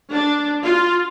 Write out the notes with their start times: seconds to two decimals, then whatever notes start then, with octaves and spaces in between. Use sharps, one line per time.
0.11 D4
0.61 F4